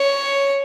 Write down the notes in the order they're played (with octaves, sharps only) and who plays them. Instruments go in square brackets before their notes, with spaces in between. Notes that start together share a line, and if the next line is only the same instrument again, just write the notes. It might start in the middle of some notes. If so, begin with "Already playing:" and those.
Already playing: [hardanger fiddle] C#5